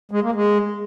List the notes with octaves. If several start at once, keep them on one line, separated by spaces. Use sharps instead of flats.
G#3
A#3
G#3